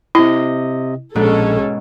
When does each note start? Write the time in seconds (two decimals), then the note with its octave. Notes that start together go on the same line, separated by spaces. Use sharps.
0.15 C3 E4 D#5
1.15 A#1 G#2 B2 C#4 G#4 A4